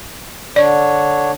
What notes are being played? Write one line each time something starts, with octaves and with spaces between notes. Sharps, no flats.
D3 D4 C#5 D5